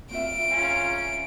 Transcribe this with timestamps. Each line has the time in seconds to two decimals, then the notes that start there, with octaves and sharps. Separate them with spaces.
0.11 C4 F4 E5 D7
0.51 C#4 F4 G#5 A#5